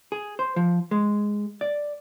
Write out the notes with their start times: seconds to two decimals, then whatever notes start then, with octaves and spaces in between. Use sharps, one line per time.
0.12 G#4
0.39 C5
0.56 F3
0.91 G#3
1.61 D5